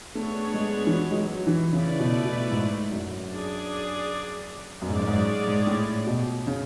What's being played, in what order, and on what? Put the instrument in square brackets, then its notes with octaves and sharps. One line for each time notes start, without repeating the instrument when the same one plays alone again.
[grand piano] A3 [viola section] B3 D4 G#4 C#5
[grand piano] G#3
E3
F#3
G#3
F#3
E3
[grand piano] C#3 [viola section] A3 E4 B4 D5
[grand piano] B2
B2
G#2
F#2
[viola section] D4 G#4 D5
[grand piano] F#2
[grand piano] G#2 [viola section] G#3 C#4 G#4 D5
[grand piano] F#2
G#2
G#2
A2
B2
C#3